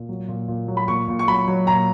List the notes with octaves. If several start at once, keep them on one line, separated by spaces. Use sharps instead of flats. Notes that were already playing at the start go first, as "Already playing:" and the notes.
Already playing: A#2
F#3
A#2
A#2
F#3
B5
A#2 C#6
A#2
C#6
F#3 B5
F#3
A#2 A#5